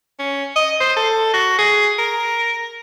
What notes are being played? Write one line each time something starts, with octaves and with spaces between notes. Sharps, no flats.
C#4
D#5
C5
A4
F#4
G#4
A#4